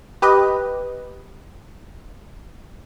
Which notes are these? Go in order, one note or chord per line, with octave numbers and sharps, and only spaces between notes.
G4 B4 D#5